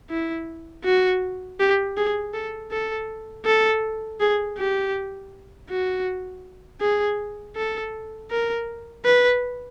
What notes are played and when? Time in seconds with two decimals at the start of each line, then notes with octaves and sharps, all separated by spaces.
0.10 E4
0.85 F#4
1.60 G4
1.97 G#4
2.34 A4
2.71 A4
3.45 A4
4.20 G#4
4.58 G4
5.69 F#4
6.81 G#4
7.56 A4
8.31 A#4
9.05 B4